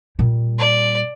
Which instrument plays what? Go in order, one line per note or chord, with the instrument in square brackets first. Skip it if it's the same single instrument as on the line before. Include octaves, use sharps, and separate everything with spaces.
[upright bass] A#2 G3
[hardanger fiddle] D5